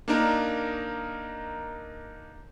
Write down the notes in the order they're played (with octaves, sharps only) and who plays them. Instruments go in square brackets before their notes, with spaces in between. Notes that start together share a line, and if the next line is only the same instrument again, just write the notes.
[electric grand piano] A#3 D4 D#4 A#4